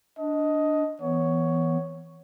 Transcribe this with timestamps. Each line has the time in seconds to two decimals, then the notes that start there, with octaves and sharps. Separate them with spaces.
0.18 D4 D#5
1.01 E3 B3 C#5